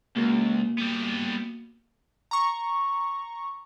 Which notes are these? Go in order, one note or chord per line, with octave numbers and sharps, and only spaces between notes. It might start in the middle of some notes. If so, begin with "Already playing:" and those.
C#2 A#3 F#4
G3 B3
A#5 C#6